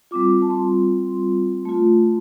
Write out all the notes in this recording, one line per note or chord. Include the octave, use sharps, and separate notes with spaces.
G3 C4 F4 D6
A5
C6
A3 F4